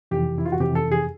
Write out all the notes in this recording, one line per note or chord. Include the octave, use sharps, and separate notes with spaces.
F2 C3 E3 G4
E4
F4
F#4
F2 C3 E3 G4
A4
G#4